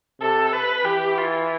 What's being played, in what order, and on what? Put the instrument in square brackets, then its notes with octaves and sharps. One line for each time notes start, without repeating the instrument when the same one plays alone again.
[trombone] C3 [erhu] A4
[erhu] B4
[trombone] E3 [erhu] G4
[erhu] F4